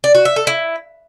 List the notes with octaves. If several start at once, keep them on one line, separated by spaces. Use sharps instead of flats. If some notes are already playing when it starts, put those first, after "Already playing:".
D5
F#4
E5
A4
E4